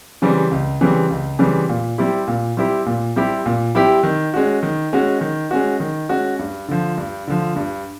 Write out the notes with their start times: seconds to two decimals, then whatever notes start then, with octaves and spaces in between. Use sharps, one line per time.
0.22 C#3 E3 G3 C4
0.51 C#2
0.81 C#3 E3 G3 C4
1.11 C#2
1.39 C#3 E3 G3 C4
1.69 A#2
1.98 G3 C4 E4 G4
2.28 A#2
2.57 G3 C4 E4 G4
2.86 A#2
3.16 G3 C4 E4 G4
3.46 A#2
3.75 G3 C4 E4 G4
4.03 D#3
4.34 G#3 C#4 F#4
4.63 D#3
4.93 G#3 C#4 F#4
5.21 D#3
5.51 G#3 C#4 F#4
5.80 D#3
6.09 G#3 C#4 F#4
6.39 G2
6.68 D3 F3
6.98 G2
7.27 D3 F3
7.56 G2